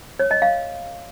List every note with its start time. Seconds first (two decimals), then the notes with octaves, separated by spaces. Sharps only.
0.20 C#5
0.31 D#5
0.42 F5